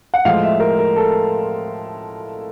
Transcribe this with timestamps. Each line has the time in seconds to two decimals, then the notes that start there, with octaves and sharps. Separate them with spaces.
0.14 F#5
0.25 A2 F3 G#3 F5
0.43 E5
0.60 A#4
0.79 A#4
0.96 A4